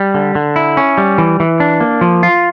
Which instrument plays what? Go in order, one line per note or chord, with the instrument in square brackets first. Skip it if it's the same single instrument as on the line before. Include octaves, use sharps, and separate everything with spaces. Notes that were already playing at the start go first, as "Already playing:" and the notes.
Already playing: [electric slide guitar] G3
D3
D3
E4
C#4
G3
E3
E3
D4
A#3
F3
F4